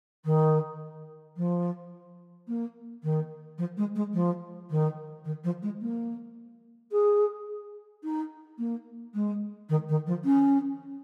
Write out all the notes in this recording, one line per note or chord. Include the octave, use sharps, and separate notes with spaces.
D#3
F3
A#3
D#3
F3
G#3
G#3
F3
D#3
D#3
F3
G#3
A#3
G#4
D#4
A#3
G#3
D#3
D#3
F3
C#4